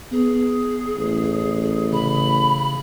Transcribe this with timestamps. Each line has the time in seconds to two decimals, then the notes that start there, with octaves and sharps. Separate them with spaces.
0.12 B3 G#4
0.97 A1
1.93 C#3 B5